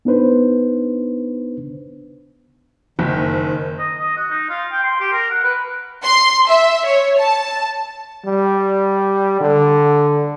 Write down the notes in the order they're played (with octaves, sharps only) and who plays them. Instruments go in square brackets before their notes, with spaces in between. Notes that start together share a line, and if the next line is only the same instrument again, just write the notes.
[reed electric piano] B3 D4 D#4 B4 C5
[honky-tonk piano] F#1 [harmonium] D#3
[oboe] D#5
D#5
F#4
D#4
F4
G5
C6
G4
A#4
F#5
B4
[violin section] C6
E5
C#5
A5
[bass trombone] G3
D3